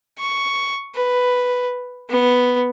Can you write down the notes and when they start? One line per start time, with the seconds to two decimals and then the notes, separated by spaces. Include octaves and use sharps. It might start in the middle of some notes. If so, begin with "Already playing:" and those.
0.18 C#6
0.96 B4
2.10 B3